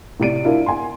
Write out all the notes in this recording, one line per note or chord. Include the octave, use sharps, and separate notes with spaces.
A2 C3 D5 D7 D#7
D4 E4 F4 A#4
G#5 C6